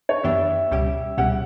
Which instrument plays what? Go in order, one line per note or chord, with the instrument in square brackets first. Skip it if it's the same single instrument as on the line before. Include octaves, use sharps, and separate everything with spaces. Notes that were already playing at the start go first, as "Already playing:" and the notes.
[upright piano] C#5
[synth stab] F#2 E3 B3 D4 G4 [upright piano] E5
[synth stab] C#2 B2 G3 C#4 G4
[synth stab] C#2 B2 G3 C#4 G4 [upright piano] F#5